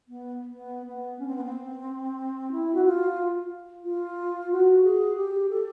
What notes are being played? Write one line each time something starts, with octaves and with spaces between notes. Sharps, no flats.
B3
B3
B3
C#4
C4
B3
C4
E4
F#4
F4
F4
F#4
G#4
G4
A4